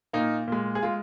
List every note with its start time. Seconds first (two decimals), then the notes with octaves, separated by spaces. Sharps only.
0.13 A#2 A#3 D#4
0.47 A#2 G#3
0.75 G#4
0.83 G#3 F4